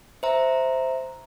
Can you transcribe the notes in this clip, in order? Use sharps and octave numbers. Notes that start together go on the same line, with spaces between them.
C5 E5 A#5